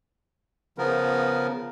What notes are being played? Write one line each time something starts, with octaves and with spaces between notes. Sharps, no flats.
C#3 F3 B3 A#4